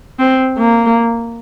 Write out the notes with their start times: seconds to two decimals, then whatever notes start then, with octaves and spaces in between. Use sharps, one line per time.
0.19 C4
0.58 A#3